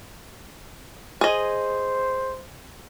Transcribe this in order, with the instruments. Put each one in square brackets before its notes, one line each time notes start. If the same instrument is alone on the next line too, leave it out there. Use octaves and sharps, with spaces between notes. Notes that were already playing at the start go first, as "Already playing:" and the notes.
[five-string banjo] G#4 D#5 [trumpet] C5